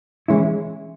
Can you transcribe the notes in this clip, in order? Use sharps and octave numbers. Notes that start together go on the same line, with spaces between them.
E3 G#3 C#4 E4